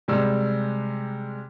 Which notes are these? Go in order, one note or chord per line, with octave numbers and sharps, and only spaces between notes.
C3 G3 G#3 E6